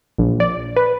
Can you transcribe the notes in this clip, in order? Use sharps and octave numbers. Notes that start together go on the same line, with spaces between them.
A#1
D5
B4